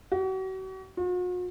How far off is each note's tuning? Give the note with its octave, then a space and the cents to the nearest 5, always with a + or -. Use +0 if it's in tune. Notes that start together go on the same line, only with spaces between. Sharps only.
F#4 +40
F#4 -45